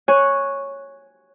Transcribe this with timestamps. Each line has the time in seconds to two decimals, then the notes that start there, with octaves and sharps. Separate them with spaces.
0.08 C#5 G#5 C#6 F#6